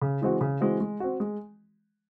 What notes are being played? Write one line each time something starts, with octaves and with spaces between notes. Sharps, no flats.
C#3
E3 G#3 C4 F#4
C#3
E3 G#3 C4 F#4
G#3
C4 F#4
G#3